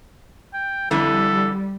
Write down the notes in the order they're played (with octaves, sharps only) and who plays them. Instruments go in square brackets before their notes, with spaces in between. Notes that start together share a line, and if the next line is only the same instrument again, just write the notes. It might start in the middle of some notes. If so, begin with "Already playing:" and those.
[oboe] G5
[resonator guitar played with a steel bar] F2 D3 E3 [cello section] G3 [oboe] A4